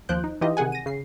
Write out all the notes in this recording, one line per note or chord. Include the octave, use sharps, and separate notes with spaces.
D#2 F3 C5 F#6 G6 D7
D#4
E3 D#4 F4 G4 D#5
C3 D#3 G#4 F#5 G#5
A#6 D#7
C#3 C7